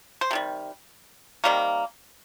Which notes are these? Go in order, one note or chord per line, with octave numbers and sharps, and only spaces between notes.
C5
C3 D#3 G3
C3 D#3 G3 A#3